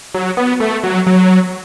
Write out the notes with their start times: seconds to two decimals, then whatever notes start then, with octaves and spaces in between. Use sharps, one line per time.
0.14 F#3
0.37 B3
0.60 A3
0.83 F#3
1.07 F#3